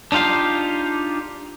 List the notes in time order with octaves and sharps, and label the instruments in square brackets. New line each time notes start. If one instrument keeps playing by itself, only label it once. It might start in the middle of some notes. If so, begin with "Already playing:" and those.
[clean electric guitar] D4 D#4 F4 G4 F5